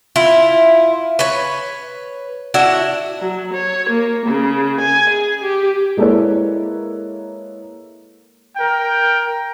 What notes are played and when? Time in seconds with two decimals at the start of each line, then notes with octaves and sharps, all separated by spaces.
0.16 E4 F4
1.19 B4 C#5
2.54 D4 E4 F#4
3.20 F#3
3.53 C#5
3.88 A#3
4.25 C#3
4.80 G#5
5.09 G#4
5.43 G4
5.97 G#3 A#3 E4 A4 B4 C#5
8.57 A#4 G5